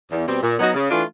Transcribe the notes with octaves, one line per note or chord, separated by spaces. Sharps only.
E2
B2 G3 C4
A#2
F#3 B3 D#4 F#4
C#3
E3 A3 D4 F4